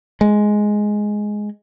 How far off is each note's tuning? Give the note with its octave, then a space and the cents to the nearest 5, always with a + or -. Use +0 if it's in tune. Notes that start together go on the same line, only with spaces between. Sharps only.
G#3 +5